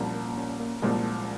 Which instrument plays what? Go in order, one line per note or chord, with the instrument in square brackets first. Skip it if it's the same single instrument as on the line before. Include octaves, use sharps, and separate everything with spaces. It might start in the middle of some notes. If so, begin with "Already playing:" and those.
Already playing: [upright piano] C2 A#2 F3 [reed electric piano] C#4
[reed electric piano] A#3
C#4
A#3
[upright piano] C2 A#2 F3 [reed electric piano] G#3